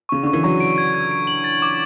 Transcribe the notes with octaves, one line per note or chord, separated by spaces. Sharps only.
C#3 C#6
D3 C#6
E3
F#3 C#6
D7
G#6
G#6
D7
F#7
A6
D6